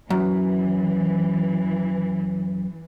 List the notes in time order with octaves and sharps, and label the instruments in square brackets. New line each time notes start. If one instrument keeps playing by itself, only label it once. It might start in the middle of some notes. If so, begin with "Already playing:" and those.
[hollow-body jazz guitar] F#2 [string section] E3